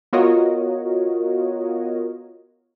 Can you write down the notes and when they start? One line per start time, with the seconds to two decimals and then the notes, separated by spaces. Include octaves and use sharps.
0.13 B3 F4 F#4 A#4 C#5 D#5